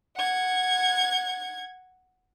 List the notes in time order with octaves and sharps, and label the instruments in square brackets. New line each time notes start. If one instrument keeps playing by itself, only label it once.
[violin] F#5 G#6